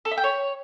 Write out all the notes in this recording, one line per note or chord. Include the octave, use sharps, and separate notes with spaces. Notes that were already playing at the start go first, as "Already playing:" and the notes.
A4
E5
G5
C#5